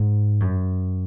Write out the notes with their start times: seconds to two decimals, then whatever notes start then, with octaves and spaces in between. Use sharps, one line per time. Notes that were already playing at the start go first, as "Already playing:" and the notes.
Already playing: G#2
0.40 F#2